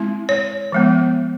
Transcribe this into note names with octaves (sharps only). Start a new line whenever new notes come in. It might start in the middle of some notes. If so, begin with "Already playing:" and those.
Already playing: G#3 C4 E4
C#5
F3 G#3 B3